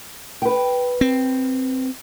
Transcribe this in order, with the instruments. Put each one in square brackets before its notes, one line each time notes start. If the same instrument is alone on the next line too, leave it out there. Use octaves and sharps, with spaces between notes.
[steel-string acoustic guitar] B4 G5
[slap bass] C4